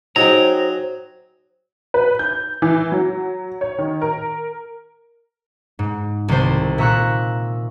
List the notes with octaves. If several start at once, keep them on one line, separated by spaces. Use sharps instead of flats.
F#3 D#4 G#4 C5 G5 A#5
B4
G6
E3
F#3
C#5
D#3
A#4
G#2
C2 D#3 A4 C5
A#2 E5 A#5 C#6 E6 F#6